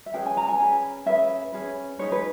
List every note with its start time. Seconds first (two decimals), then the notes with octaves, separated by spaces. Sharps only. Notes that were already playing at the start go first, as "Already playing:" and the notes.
0.06 E5
0.14 C#4 G#4 B4 G5
0.26 G#5
0.37 A#5
0.48 G#5
0.60 C#4 G#4 B4
1.06 C#4 G#4 B4 E5
1.52 C#4 G#4 B4
1.98 D#4 G#4 B4 C#5
2.12 B4